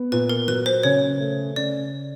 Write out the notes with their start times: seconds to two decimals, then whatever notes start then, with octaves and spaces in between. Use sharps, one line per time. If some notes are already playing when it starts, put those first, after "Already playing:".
Already playing: B3
0.12 A#2 B4
0.29 A#4
0.48 F#3 B4
0.66 C5
0.83 C#3 C#5
1.20 A3
1.56 C#3 D5